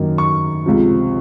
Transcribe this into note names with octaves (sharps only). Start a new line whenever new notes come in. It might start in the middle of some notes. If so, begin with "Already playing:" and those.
Already playing: F#2 D#3 A#3
C#6
C#2 C3 F3